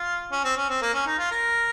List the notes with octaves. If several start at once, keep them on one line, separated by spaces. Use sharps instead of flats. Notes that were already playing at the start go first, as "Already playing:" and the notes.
Already playing: F4
C#4
C4
C#4
C4
A#3
C#4
D#4
F4
A#4